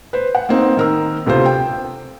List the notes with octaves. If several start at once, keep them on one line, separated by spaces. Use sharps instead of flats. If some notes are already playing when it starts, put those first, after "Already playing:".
B4 C5
F#5
A#3 C4 D#4
D#3 A#4 E6
D2 C3 B3 F4 C5
G5